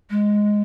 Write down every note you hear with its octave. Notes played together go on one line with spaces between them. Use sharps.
G#3